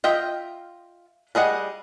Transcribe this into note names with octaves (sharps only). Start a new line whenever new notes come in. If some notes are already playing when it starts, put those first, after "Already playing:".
F4 D#5 E5 G5
G3 G#4 D#5 F#5